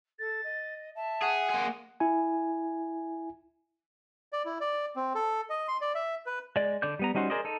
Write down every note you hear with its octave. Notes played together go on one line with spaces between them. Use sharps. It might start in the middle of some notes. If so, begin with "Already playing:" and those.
A4 A6
D#5
E5 A5
G#4 F#5
A#3 G#4 C6
E4 G#5
D5
E4
D5
C4
A4
D#5
C6
D5
E5
B4
G#3 D5
D3 D5 D6 G6
G3 B3 A#5
G3 C#4 D#4 F#4 C5
G#4 A#4 C5 D5 D#5
D#4 A4